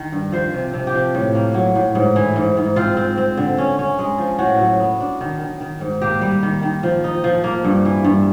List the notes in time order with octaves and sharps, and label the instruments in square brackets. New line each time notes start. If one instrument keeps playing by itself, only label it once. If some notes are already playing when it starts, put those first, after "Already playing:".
Already playing: [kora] D#3
G2
F3 C5
C3
C3
G4
F3
A2
A#3
F#3
A2
G#2
E3
G#2
G#2
C4 F4
C4
C4
D3
C#4
C#4
G#3
F3
A2 F#4
F#3
B3
D4
D#3
D#3
D#3
G#2
A#3 G4
G3
D#3
D#3
F3
D#4
F3
A#3
G2
E3
G2